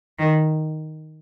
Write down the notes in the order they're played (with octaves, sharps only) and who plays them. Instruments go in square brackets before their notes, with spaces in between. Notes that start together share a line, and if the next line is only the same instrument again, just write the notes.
[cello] D#3